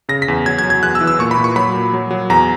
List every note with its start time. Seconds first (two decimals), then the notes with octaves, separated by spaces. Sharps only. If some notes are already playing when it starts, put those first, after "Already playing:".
0.09 C#3 A#6
0.22 B6
0.28 E2
0.46 F#3 G#6
0.59 G#6
0.64 F#3
0.70 G#6
0.83 E2 F#6
0.95 E6
1.01 E3
1.07 E6
1.19 A#2 C#6
1.31 B5
1.38 A#2
1.44 C#6
1.56 F#3 B5
1.74 A#2
1.93 F#3
2.11 F#3
2.30 E2 A#5